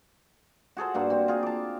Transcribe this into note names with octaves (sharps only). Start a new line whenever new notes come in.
F#4 G#4 A4 C5
G2 A#3 F#4
C4 F#4
F4 G#4
A5 D6